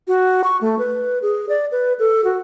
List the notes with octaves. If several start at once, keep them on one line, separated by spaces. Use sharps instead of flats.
F#4
C#6
A3
B4
G#4
D5
B4
A4
F#4